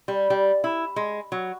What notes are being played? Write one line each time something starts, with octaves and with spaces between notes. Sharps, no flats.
G3
G3
E4
G#3
F#3